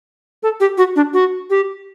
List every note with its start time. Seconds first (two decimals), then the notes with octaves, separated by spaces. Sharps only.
0.43 A4
0.60 G4
0.78 F#4
0.96 D4
1.13 F#4
1.50 G4